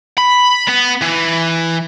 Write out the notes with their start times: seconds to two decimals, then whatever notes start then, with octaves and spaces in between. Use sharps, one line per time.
0.18 B5
0.69 B3
1.02 E3